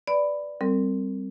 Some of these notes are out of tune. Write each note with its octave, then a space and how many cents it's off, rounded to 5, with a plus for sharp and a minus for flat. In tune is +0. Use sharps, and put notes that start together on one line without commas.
B4 +0 D5 +0 B5 +10
G3 +0 C4 +0 A#4 -40